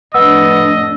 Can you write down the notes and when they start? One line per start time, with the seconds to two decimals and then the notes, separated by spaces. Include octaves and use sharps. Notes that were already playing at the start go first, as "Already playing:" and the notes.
0.14 F2 A2 B3 D4 D#5 E6